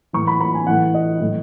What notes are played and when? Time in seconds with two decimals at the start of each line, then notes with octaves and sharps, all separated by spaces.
0.13 A2 E3 C#6
0.27 B5
0.41 B5
0.54 G#5
0.67 A2 E3 F#5
0.94 D#5
1.20 A2 E3